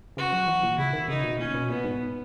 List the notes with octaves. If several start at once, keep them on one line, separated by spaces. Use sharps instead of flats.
C#3 F#4
F#3
E3
A#2
C#3 E4
D#3
C#3 D#4
B2
A#2 C#4
B2
A#2 B3
G#2